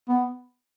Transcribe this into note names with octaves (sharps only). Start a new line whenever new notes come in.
B3